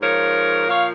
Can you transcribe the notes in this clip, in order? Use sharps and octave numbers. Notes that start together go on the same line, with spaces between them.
G#2 F3 A#4 C#5
A#2 F3 C#5 F5